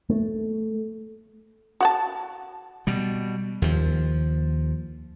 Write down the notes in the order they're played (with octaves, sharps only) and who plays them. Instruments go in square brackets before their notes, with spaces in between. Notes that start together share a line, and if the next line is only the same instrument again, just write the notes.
[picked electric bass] A3
[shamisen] F#4 F#5 A5
[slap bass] B2 G3
D#2 F3